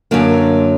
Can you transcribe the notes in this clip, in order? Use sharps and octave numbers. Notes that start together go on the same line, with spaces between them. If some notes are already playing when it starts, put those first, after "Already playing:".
F#2 D3 F#3 A#3